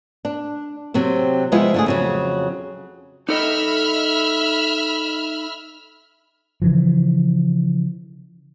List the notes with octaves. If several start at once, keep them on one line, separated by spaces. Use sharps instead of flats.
D4
C3 F#3 C4
F3 G#3 B3 E4 F4
D3 A3 G#4
F2 C#3 F#3
D#4 A4 D#5 E5 B5 F6
C#3 E3 F3